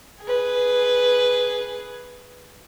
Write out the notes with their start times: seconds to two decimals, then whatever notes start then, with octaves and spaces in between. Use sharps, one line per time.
0.23 G#4 B4